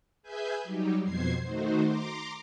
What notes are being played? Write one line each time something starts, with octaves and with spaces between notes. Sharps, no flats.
G#4 B4 E5 G#5 G6
F#3 G3 D#4 G4
F2 B2 C5 G#6 C7
D#3 A3 D#4 F#4 C5
A#5 C6 D6